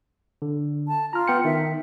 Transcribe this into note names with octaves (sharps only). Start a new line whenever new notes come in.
D3
A5
F4 A#5 F6
B3 G5 C#7
D#3 E5